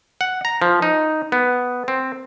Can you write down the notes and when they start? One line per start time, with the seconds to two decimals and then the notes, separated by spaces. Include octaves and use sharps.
0.21 F#5
0.45 A#5
0.62 F3
0.82 D#4
1.32 B3
1.88 C4